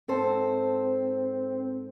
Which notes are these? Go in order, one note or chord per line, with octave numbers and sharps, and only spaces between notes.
G#2 C4 A4 C5